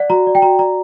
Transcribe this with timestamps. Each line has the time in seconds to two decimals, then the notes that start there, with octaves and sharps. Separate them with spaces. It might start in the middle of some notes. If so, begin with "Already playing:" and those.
Already playing: D5 F#5
0.10 F#4 A#5
0.27 D5
0.35 G5
0.42 F#4 A#5
0.59 D5 A#5